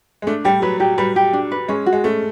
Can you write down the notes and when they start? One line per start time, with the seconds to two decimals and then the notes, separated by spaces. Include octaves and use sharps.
0.22 G#3
0.27 A3 D4
0.44 G3 G4
0.62 F#3 B4
0.80 F#3 G4
0.98 G3 B4
1.16 G4
1.33 D4
1.51 B4
1.68 G#3 C#4
1.86 F#4
1.93 G#3
2.04 A3 C#4